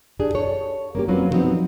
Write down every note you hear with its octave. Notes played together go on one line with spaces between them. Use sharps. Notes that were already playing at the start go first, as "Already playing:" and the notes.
D4 G4 G#4
A4 C#5
A#3 C#4 G4
F#3 C4 C#4 F4 B4
D3 F3 F#3 B3 C4 D#4